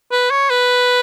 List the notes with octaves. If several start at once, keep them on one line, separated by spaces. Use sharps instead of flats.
B4
C#5
B4